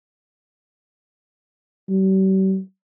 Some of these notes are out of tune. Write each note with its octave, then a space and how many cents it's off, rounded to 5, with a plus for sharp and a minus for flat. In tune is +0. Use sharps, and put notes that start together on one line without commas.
G3 -45